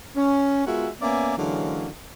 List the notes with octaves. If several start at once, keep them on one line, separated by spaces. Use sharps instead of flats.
C#4
G#3 B3 F4 F#4 A#4 E5
A#3 B3 C#4 D5 E5 G#5
D3 E3 F#3 G#3 A#3 C#4